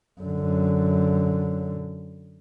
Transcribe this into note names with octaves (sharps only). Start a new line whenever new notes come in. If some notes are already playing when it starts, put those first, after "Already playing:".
F#2 D3